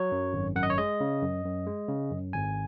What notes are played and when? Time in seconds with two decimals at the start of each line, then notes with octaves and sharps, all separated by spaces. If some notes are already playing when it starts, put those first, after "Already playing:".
Already playing: F#3 C#5
0.12 F#2
0.33 G#1
0.55 F#2 F#5
0.63 D#5
0.70 C#5
0.78 G#3 D#5
1.00 C#3
1.22 F#2
1.45 F#2
1.67 G#3
1.89 C#3
2.11 F#2
2.33 G#1 G#5